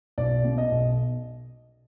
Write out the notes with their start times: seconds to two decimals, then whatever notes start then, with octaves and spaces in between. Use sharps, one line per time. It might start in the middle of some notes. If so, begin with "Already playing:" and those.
0.18 B1 D5
0.44 B2
0.58 D#5
0.71 B1